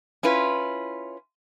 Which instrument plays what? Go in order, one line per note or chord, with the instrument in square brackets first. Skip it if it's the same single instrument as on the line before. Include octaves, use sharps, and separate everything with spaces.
[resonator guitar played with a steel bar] C#4 E4 F4 B4